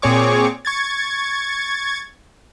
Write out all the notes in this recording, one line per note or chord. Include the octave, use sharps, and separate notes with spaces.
A#2 C4 G#4 C#5 C#6 D6
C#6 G#6 A6